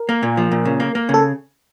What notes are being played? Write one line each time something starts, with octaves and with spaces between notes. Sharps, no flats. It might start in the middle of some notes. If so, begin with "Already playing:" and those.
Already playing: A#4
A#3
A#2
F3
A#2
C#3
A#3
A#3
C#3
A4